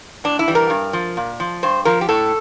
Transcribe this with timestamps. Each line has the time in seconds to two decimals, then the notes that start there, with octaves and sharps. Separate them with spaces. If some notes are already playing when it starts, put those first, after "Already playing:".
0.24 A2 D4
0.39 E4
0.48 E3 G3
0.55 A#4
0.70 G2
0.93 F3
1.17 A#2
1.40 F3
1.63 G2 C5
1.85 F3 A#4
2.01 G4
2.09 A2 A4